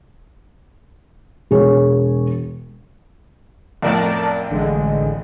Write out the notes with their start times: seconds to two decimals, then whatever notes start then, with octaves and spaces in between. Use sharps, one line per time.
1.51 E1 G#4 C#5
3.82 B1 F2 A2 A#4 D5 A5
4.50 A1 D3 G#3